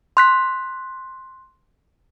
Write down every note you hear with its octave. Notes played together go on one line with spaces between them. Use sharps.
C6 F#6 B6